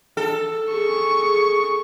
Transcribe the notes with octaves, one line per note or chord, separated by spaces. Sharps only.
A4
G#4 C#6